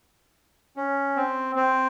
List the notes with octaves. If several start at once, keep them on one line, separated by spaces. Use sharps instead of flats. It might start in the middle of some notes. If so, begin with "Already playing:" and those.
C#4
C4
C4